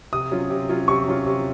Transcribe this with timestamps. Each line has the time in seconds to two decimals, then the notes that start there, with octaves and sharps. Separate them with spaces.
0.13 C3 D#6
0.31 F#3 C#4 F4
0.50 C3
0.69 F#3 C#4 F4
0.88 C3 C#6
1.06 F#3 C#4 F4
1.26 C3